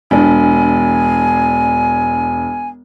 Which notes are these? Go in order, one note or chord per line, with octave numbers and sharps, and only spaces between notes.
E1 D4 G#5